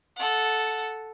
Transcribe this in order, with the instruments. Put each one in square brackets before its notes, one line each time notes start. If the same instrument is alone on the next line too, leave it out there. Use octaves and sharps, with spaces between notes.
[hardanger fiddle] A4 F#5